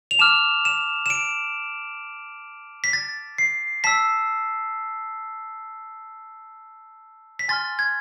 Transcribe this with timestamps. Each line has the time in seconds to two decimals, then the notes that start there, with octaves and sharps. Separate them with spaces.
0.11 F7
0.19 A5 D6 F6 E7
0.65 E7
1.06 E7
1.10 D7
2.84 B6
2.93 A6
3.38 C7
3.84 A5 E6 B6
7.39 B6
7.49 G#5 C6 F6 A6
7.79 G#6